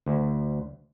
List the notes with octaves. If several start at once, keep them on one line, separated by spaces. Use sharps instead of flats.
D2